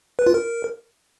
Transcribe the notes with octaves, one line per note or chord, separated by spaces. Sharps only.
B4
F4
A#4